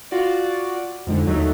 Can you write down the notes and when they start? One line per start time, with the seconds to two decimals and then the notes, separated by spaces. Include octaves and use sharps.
0.11 F4 F#4 D5
1.07 F2 G#2 D3
1.27 D#2 F#3 A3 D#4